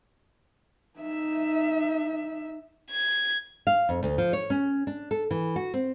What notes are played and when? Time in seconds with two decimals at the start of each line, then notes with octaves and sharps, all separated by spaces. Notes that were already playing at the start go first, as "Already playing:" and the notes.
0.99 D#4 E5
2.91 G#6
3.67 F5
3.89 F2
4.03 D2
4.18 F3
4.33 C#5
4.50 C#4
4.87 D4
5.11 A4
5.31 E3
5.56 F#4
5.74 C4